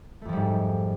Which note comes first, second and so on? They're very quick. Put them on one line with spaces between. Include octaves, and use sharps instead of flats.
A3 F2 F3 G3 G#2